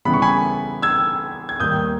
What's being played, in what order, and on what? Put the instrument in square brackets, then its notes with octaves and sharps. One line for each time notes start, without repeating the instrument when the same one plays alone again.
[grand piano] C#3 E3 G3 B3 B5
C#6
G#5 B5
E6 G#6
G#6
D#2 D#3 G3 A#3 D#6 G6